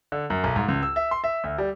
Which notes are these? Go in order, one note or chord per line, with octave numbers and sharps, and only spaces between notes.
D3
F#2
B1
G#2
C#2
E6
E5
C6
E5
D2
G3